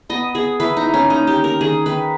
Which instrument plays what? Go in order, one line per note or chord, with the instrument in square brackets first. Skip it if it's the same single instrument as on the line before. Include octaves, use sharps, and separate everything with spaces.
[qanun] B3 D#5
B3 G#4
E3 B4
D#4
E3
C#4
A#3 D#4
G4
D#3
A#4
D#3 G#4
D#3 B4